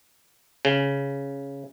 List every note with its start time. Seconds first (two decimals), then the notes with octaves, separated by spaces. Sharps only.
0.65 C#3